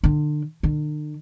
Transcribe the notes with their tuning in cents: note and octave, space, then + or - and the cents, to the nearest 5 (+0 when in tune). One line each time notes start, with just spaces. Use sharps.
D3 +35
D3 +45